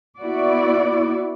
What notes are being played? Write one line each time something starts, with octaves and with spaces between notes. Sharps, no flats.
B3 E4 F#4 D5